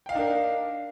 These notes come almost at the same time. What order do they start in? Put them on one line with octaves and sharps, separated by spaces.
G5 F5 D#4 D4 A#4